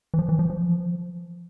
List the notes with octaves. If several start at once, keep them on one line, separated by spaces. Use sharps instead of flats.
E3
F3
E3
F3
F3